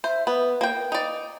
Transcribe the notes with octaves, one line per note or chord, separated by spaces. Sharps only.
C5 E5
B3 B4
A#3 G5
D#4 D5